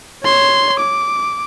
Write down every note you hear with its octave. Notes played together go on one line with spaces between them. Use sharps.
C#5 C6
D6